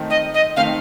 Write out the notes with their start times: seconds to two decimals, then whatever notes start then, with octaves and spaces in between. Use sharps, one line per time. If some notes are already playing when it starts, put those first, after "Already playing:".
Already playing: D#3 A3 C4 D#4
0.10 D#5
0.34 D#5
0.56 D#3 A3 C4 D#4 F5